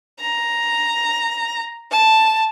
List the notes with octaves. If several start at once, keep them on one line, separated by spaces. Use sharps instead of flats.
A#5
A5